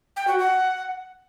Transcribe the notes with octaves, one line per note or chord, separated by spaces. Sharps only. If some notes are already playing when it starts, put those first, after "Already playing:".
G5
F#4
F#5